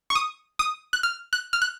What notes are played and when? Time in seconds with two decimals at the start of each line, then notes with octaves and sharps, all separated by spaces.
0.10 C#6
0.15 D#6
0.59 D#6
0.93 F#6
1.03 F6
1.33 F#6
1.53 F6
1.62 F#6